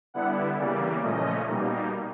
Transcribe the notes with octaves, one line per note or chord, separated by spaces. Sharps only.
D3 G3 B3 E4 F#5
C#3 E3 G3 A#3 D5
A#2 F3 A3 C#4 D#5
B2 G3 A#3 D#4